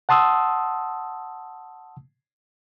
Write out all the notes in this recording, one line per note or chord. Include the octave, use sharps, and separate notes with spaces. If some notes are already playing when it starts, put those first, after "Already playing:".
F#5 A5 C6 D#6 E6